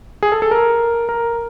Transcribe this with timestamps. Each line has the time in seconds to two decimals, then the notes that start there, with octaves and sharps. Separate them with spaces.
0.23 G#4
0.32 A4
0.42 A4
0.51 A#4
1.09 A#4